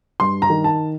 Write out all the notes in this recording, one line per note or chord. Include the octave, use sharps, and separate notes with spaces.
G2 C6
A#5
D#3
A5